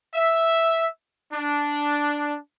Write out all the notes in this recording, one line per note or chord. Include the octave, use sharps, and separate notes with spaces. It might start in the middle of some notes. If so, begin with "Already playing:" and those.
E5
D4